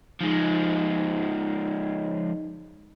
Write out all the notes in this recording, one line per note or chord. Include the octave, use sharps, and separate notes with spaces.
F3 G#3 D#4